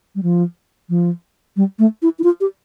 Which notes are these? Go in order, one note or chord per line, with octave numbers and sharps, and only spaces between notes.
G3
F3
F3
G3
A3
E4
E4
F4
G4